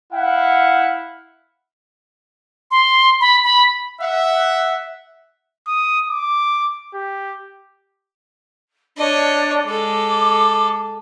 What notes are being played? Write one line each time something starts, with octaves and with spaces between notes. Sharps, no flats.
E4 F5 F#5
C6
B5
B5
E5 F#5
D#6
D6
G4
D4 C#5 D#5
G#3 A4 D6